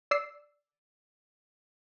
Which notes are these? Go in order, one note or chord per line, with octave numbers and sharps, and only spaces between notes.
D5 E6 C7